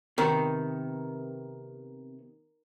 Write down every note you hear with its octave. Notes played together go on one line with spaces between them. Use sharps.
C3 D#3 B3